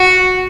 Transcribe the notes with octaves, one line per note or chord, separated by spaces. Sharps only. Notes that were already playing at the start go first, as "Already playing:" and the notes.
Already playing: F#4